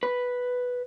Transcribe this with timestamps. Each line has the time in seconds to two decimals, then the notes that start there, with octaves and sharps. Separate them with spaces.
0.03 B4